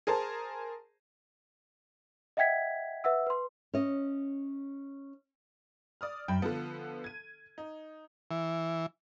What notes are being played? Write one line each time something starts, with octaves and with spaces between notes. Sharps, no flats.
G#4 A#4 C5 A5
D#5 E5 F#5 G5 G#6 B6
B4 E5 F#5 E6
B4 C6
C#4 D#5
D5 D#6 F6
F#2 G5 B5
D3 F3 B3 A4
G#6 D#7
D#4
E3